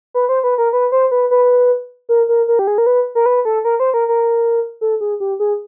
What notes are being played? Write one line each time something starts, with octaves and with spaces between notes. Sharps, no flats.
B4
C5
B4
A#4
B4
C5
B4
B4
A#4
A#4
A#4
G4
G#4
A#4
B4
A#4
B4
A4
A#4
C5
A#4
A#4
A4
G#4
G4
G#4